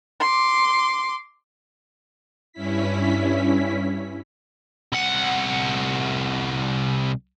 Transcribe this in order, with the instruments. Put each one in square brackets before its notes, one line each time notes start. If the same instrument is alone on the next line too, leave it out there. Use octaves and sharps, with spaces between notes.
[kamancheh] C6 D6
[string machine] G2 C#4 E4 B6
[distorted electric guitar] C2 F#5